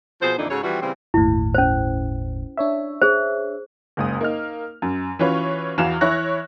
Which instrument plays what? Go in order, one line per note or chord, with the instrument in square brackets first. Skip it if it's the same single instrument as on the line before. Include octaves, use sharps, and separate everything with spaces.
[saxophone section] B2 F3 G#4 C5
F2 A#2 D3 E3 D4 D#4
G#2 C#3 F#4 A4 C#5
E3 F3 G3 C4 E4 F#4
C#3 E3 G3 C4
[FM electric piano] G1 D#2 A2 [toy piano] E4
[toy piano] C#4 C5
[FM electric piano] D4 C#5 E5
[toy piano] G#4 C5
[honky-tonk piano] F#1 C#2 D#6
A#3 D#4 F6
F#2
E3 C#4 F4 F#4 B4 C#5
E2 E3 F#4 F5 F6 E7
E3 E4 C#5 C#6 F#6 A#6